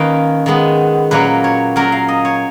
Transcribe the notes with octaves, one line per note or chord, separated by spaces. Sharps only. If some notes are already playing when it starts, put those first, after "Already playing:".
Already playing: D#3 A#3 C#4 B4
D#3 G#3 B3
A#2 F#3 A#3 C#4 B4
C#5
A#2 F#3 C#4 A#4
F5
D#5
C#5